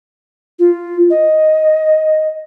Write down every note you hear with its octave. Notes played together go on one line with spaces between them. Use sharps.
F4
D#5